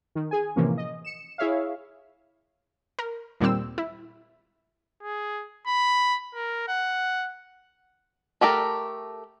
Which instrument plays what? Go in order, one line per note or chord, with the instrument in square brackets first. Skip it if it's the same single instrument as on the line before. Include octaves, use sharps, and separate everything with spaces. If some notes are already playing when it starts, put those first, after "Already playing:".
[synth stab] D#3
G#4 G#5
A2 C3 E3 F3 A#3 C#4
D#5
C#7 E7
E4 G#4 C#5 E5 F5
[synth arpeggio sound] A#4
D#2 A#2 G3 C4 E6
E4
[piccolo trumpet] G#4
B5
A#4
F#5
[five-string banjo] A3 G4 A4 A#4